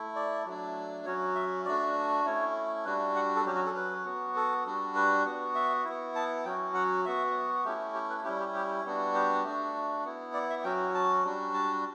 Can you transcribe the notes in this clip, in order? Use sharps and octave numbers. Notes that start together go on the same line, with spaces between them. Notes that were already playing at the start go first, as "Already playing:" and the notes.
Already playing: A3 E4
D5
F#3 A3 D4
F#3 C#4 F#4 C#5
E5
A3 D4 F#4 D5
A3 C#4 E4 C#5
G3 D4 F#4 B4
F#5
A4
F#3 C#4 F#4 G4
F#4
A4
B4
B3 F#4
A4
G3 D4 F#4
B4
B3 F#4
E5
B3 E4
A5
F#3 C#4 F#4 G5
F#5
B3 F#4 E5
A3 C#4 E4 G4
G4
B4
G3 C#4 E4 G4
G4
G4
G3 B3 D4 F#4
G4
A3 D4 F#4
B3 E4
D5
E5
F#3 C#4 F#4 G5
A5
G3 D4 F#4
A5